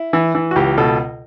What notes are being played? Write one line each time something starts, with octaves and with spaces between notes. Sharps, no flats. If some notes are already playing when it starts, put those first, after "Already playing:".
Already playing: E4
E3
E3
F#4
C#2 G4
B2 A4